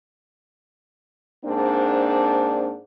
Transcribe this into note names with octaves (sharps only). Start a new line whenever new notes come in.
G#2 A#3 C4 D4